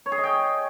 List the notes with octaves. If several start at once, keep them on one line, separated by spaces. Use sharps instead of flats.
C#5
G#4
D#5
G5